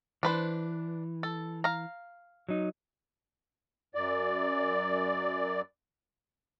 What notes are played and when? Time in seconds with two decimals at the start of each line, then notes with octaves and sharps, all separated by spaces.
0.23 E3 D4 B4 C5
1.23 A4
1.64 F5 A#5
2.49 F#3 D#4
3.95 F#2 D5